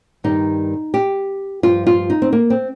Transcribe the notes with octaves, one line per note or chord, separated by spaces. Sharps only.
G2 D#3 G3 D#4
G4
G2 F3 F4
F4
D#4
C4
A#3
C4